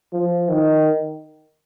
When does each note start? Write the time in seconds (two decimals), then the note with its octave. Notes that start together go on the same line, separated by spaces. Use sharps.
0.13 F3
0.49 D#3